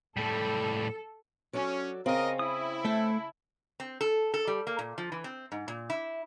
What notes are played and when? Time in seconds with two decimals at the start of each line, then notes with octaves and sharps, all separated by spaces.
0.17 A2 G3 A4
1.53 F#3 C#4 D4 A4
2.06 C#3 C4 C#4 A#4 D#5
2.39 E4 D#6
2.85 A3 E5 G5 A5
3.80 C4
4.01 A4
4.34 A4
4.47 G3
4.67 A#3
4.79 A#2
4.98 F3
5.12 E3
5.24 C4
5.52 G#2
5.68 A#2
5.90 E4